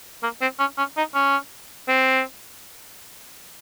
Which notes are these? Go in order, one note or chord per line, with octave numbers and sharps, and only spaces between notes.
A#3
C4
C#4
C#4
D#4
C#4
C4